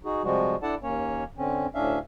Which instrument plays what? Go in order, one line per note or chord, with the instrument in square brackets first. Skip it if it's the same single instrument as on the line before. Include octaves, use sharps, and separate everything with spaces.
[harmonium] D#4 F#4 G#4
C3 F3 G3 G#3 F#4
D4 E4 A4 D5 F#5 A5
D#2 A#3 C#4 C#5
D3 C4 C#4
D2 A2 C#4 D4 E5 F5